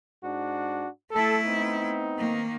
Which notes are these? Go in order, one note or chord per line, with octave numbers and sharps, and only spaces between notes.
G#2 D4 F#4
A3 E4 A4
B3 C4 D#4
D#3 A#3